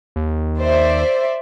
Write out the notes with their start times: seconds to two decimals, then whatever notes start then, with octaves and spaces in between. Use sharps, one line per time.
0.16 D#2
0.59 C5 D5 E5